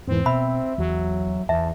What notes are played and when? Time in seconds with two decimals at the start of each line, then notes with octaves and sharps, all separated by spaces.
0.08 E2 G#2 E3 C4
0.26 B2 E5 B5
0.78 E2 F#3
1.49 E2 E5 A5